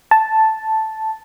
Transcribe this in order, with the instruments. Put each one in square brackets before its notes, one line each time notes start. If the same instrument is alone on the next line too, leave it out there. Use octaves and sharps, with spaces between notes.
[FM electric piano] A5